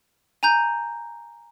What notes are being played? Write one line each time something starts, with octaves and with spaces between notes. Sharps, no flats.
G#5 A#5 G6